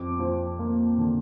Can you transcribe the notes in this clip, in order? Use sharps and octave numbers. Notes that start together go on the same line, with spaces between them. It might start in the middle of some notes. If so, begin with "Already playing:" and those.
Already playing: F2 D6
F3
A#3
D3